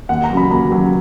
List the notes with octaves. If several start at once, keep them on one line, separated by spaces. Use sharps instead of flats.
D#2 F#5
A#5
C#3 F#3
B5
D#2 A#5
C#3 F#3